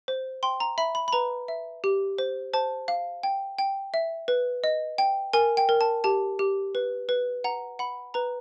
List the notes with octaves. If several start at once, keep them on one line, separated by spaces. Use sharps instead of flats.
C5
G5 C6
A#5
E5 B5
B5
B5
B4 A#5
E5
G4
C5
C5 A5
F5
G5
G5
E5
B4
D#5
G5
A#4 G#5
G5
A#4
A5
G4 A5
G4
B4
B4
F#5 A#5
F#5 B5
B4 A#5